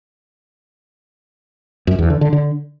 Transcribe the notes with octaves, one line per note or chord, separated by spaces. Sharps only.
F#2
E2
D3
D3
D3